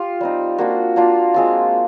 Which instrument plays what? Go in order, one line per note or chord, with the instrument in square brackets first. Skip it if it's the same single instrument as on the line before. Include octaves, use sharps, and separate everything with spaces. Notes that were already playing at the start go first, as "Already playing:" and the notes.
Already playing: [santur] F4 G4
G3 C4 D#4
A#3 D4 F4 F#4
A#3 D4 F4
G#3 C4 F4